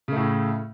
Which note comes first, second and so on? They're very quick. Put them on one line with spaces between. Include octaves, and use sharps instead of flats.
C#3 A3 A2